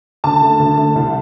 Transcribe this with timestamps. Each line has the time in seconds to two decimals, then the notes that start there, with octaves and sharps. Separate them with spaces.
0.24 D2 A5
0.42 D3 A3
0.59 D2
0.77 D3 A3
0.95 C2